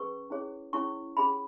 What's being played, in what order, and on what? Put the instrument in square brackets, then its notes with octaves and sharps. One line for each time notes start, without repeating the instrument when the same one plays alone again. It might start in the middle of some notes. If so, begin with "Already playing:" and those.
Already playing: [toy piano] C#4 G#4 B4 C#6
C#4 E4 G#4 C#5
C#4 E4 G#4 C#5 C#6
C#4 G#4 C#5 B5